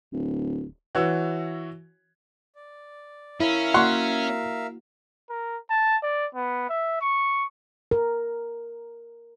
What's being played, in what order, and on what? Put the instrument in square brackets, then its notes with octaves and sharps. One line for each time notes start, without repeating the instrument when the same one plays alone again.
[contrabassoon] D1
[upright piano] E3 F#4 C#5 E6
[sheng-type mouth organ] D5
[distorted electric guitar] C#4 [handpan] E4 [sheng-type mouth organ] A#4 E5 F5
[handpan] A#3 F#4 [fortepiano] F#5 C6 C#6
[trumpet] A#4
A5
D5
B3
E5
C#6
[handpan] A#4